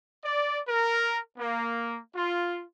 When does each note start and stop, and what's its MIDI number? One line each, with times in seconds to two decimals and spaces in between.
0.23 0.60 74
0.68 1.19 70
1.38 1.98 58
2.16 2.63 65